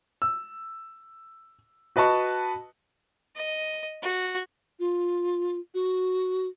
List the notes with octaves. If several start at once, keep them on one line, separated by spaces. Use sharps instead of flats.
E6
F#4 B4 D#5 A5 C#6
D#5
F#4
F4
F#4